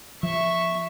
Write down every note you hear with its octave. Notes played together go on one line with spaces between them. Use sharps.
F3 E5 C#6